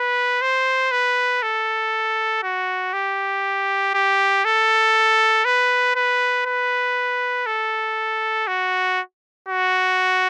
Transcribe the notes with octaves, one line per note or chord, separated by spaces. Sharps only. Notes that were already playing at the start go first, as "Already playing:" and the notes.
Already playing: B4
C5
B4
A4
F#4
G4
G4
A4
B4
B4
B4
A4
F#4
F#4